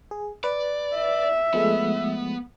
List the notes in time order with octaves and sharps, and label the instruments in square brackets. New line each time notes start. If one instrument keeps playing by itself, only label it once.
[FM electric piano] G#4
[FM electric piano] B4 [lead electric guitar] D5
[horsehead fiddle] E5
[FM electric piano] F3 G#3 A3 [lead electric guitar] B3